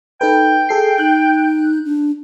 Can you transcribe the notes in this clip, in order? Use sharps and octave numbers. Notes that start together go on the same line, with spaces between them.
D#4 A4 B4 G5
G#4 A4 C7
D#4 F#6 G6
D4